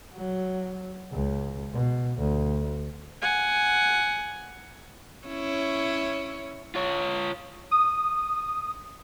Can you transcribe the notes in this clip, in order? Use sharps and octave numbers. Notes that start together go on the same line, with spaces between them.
F#3
C#2
B2
D2
F#5 G#5
C#4 E4 C#5
F4 C#5
D#6